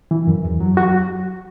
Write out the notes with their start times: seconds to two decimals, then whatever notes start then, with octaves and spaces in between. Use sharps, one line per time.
0.11 E3
0.27 F#2
0.44 E2
0.60 F#3
0.77 F#3 F#4